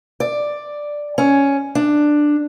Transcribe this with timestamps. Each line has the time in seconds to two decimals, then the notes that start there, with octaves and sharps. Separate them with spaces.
0.20 D5
1.18 C#4
1.75 D4